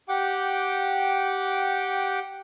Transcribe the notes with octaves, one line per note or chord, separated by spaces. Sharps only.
G4 F#5 G5 D6